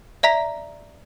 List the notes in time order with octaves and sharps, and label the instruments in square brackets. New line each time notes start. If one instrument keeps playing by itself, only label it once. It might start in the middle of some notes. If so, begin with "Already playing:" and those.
[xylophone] D5 E5 A#5 B6